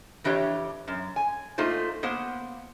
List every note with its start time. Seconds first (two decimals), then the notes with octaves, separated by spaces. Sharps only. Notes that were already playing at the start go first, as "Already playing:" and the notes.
0.24 F2 E3 D4 G4 C#5
0.88 F#2
1.16 G#5
1.58 A3 A#3 D#4 F4 C5
2.03 A#3 B3 C5 F#5